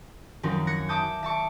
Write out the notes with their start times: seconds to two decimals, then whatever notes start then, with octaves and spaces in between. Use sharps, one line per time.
0.43 F#2 D#3 F3 C4 C#4 D#4
0.67 F#6 G#6 A#6 C#7
0.88 E5 A5 D6 D#6 G6 A6
1.23 E5 A5 C#6 D6